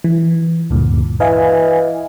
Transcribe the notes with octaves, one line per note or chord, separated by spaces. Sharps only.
E3
D2 G2 A#2
E3 D#5 F5 G#5